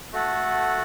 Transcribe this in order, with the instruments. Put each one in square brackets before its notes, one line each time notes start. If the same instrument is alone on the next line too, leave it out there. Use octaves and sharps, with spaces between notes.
[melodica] A3 F#4 A4 F#5